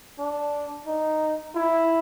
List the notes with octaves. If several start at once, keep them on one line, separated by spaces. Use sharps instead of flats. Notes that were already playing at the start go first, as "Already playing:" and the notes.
D4
D#4
E4